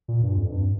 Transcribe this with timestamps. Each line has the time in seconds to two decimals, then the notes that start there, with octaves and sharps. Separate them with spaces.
0.08 A#2
0.23 G2
0.38 F2
0.52 G2